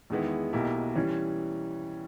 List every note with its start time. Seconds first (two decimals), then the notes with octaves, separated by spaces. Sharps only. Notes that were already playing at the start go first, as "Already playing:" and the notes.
0.10 E2 D#3 G#3 B3 E4
0.53 B1 B2 A#3 E4 G4
0.95 E3 G3 C#4